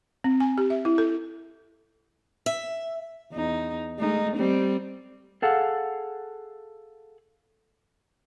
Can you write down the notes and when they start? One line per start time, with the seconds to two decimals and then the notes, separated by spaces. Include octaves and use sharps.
0.24 C4
0.40 G#5
0.58 G4
0.70 E5
0.85 E4
0.98 A4
2.46 E5
3.32 E2 D#4
3.99 G#3 A3 D#4
4.36 G3 C4
5.42 G#4 A4 F5 F#5